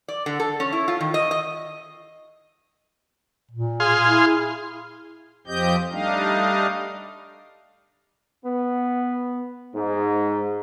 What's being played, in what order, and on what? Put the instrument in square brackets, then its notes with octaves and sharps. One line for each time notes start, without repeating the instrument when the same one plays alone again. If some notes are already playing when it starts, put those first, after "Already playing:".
[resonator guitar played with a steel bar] D5
D3
A4
C#4
E4
F4
D#3
D#5
D#5
[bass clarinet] A#2
[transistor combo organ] G#4 F5 C6
[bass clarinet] E4
[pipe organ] F2 F3 C4 G4 D#5 G6
G3 A3 D4 D#4 D#5 F5
[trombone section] B3
G#2